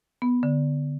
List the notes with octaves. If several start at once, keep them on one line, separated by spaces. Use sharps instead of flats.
B3
D3